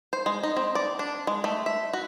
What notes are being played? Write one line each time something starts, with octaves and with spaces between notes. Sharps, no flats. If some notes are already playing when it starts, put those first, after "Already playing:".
C5
G#3
D#4
C4
D5
D4
G#3
A3
E5
F#4